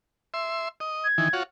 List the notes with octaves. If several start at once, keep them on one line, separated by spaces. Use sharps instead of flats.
E5 C6
D#5
G#6
D#3 E3
F4 F#4 C#5